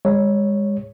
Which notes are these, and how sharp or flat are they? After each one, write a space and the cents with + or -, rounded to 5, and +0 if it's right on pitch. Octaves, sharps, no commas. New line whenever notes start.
G#3 -35 C#5 +0